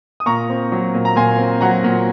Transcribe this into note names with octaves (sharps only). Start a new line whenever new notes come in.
D#6
A#2 A#5 C#6
C4
F#3
A#2
A#5
A#2 G#5 C6
C4
F#3 F#5 A#5
A#2